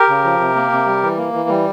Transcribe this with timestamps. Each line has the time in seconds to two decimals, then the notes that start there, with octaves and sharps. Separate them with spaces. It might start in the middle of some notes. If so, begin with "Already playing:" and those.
Already playing: G4 A#4
0.09 C#3
0.25 F3
0.40 C3
0.56 A#3
0.72 C3
0.86 G3
1.03 E3
1.18 A#3
1.33 E3
1.49 G3